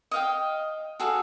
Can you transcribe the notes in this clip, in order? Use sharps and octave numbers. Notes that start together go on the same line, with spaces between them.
D#5 F5 G5
F#4 G#4 A4 F5